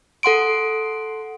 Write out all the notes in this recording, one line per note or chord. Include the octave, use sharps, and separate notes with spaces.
A4 F#5 C6 D7